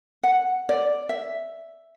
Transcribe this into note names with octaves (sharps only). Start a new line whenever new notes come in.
F#5
D5
E5